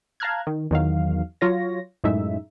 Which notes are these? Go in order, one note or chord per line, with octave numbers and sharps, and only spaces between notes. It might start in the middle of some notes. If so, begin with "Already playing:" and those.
F5 A5 A#5 F6 F#6 G#6
D#3
E2 D#3 F#3 F5
F#3 F4 C#5 A#6
F#2 A2 G#3 D#4 E5